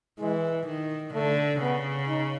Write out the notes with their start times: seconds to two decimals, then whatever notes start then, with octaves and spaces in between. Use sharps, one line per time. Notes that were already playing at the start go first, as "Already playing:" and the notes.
0.20 E3 G#3
0.67 D#3
1.14 D3 A3
1.61 C#3 B3
2.08 D#4